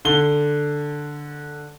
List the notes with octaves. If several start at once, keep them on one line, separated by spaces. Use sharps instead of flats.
D3 G7